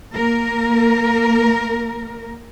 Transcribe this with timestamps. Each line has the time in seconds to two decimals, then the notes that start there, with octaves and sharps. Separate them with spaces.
0.14 A#3 A#4